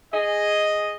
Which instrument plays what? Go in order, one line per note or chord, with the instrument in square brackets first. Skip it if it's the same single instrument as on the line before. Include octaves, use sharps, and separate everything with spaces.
[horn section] G#4 D#5